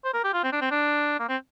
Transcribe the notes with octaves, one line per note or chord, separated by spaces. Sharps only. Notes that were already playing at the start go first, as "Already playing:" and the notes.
C5
A#4
G4
F4
C4
D4
C4
D4
A#3
C4